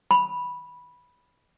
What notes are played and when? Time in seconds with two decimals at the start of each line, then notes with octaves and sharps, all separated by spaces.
0.11 B5